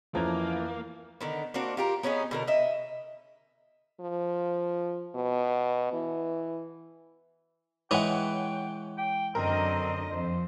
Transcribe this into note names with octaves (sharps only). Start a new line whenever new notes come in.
F2 E3 F3 A#3 C#4 A4 A#5 G#6
D3 D#3 B3
A#3 C4 D4 F#4
F4 G4 A#4
B3 C#4 D#4 G#4
B2 D3 A#4
D#5 E5
F3
B2
E3
E3 G#3 B4 C#5 F#5 G5
G5
F#2 D3 C4 A#4 D#5
F2 C5